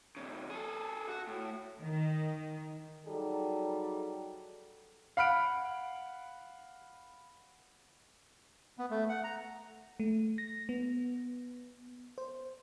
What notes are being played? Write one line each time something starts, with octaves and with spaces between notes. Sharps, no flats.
F2 C#3
G#4 A4
F#4
A2
D#3
F#3 G3 D#4 G#4 A4
F5 F#5 B5 F6 D7
B3
A3
F#5
A#5
A3
A#6
B3
C5